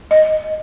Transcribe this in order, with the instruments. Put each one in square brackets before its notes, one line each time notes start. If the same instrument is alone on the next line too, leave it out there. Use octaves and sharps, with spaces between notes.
[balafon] D#5